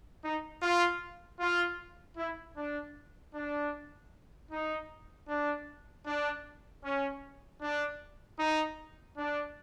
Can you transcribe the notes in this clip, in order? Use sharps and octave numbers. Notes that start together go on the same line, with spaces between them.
D#4
F4
F4
E4
D4
D4
D#4
D4
D4
C#4
D4
D#4
D4